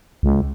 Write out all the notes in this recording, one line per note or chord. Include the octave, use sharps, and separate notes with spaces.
C#2